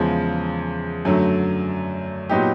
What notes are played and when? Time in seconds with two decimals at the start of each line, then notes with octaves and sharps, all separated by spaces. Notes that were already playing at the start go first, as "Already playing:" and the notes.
Already playing: E2 C#3 F3 G#3
1.05 F#2 D3 F#3 A3
2.29 A#2 F#3 B3 D#4 G4